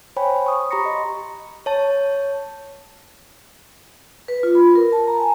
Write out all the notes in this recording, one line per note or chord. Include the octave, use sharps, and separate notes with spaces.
C5 C#5 G5 G#5 B5
C#6 D#6
G4 A#5 B5 C#6 A#6 C#7
D#5 C6
C#5 A5
B4
F4
B5
A#4
A5
A#5
G#5